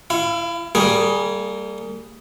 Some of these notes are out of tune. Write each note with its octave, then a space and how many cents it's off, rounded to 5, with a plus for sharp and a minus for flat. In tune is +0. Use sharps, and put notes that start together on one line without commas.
E4 +25 F5 -30
G3 +0 A#3 -35 G#4 +0